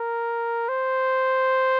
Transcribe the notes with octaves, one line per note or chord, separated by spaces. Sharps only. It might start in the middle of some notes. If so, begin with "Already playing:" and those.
Already playing: A#4
C5